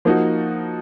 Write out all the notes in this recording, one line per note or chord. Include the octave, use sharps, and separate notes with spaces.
F3 A#3 D#4 F#4